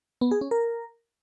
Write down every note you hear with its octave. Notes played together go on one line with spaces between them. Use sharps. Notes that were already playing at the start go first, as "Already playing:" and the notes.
B3
G#4
C#4
A#4